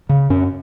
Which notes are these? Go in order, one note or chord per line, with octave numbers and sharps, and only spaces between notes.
C#3
F#2 C#4